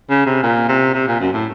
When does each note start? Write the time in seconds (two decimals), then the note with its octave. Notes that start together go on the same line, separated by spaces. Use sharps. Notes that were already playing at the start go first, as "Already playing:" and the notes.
0.10 C#3
0.26 C3
0.43 A#2
0.68 C3
0.94 C3
1.08 A#2
1.20 F#2
1.33 A2